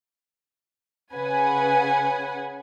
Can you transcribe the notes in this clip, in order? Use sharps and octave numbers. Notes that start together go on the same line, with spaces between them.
C#3 B4 F#5 G#5